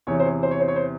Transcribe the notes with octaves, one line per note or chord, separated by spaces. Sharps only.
E2 C3 E3 C#5
C5
C#5
C5
C#5
C5
C#5
C5